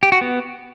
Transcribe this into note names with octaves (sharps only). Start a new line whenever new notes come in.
G4
F#4
B3